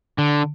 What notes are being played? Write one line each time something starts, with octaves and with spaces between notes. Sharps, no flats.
D3